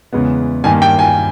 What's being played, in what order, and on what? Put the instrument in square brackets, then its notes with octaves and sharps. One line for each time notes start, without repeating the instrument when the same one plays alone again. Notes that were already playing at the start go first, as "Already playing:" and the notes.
[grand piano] E2 C#3 G#3 B3
G2 D#3 A#3 G#5
G5
G#5